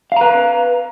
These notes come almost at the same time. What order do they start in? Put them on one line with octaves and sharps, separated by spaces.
F5 A#5 B4